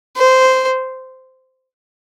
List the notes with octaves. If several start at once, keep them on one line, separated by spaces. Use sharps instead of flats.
C5